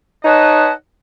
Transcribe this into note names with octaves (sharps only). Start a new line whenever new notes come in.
D#4 B4 C#5 D#5 F#5 A5